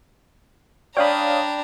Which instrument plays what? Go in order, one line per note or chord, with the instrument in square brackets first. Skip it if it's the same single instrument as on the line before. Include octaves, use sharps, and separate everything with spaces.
[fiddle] D4 A#5 [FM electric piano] C#5 F5 D#6 [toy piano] D5 [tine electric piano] G5 B5